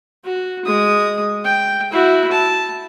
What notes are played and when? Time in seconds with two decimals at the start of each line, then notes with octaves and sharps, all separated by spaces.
0.24 F#4
0.65 G#3 D#6
1.45 G5
1.92 E4 F#4
2.31 A5